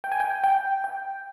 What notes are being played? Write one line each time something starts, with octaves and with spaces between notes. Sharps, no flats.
G5
G#5
G5
G5
G5